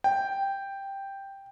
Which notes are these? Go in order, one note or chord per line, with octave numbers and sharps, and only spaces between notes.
G5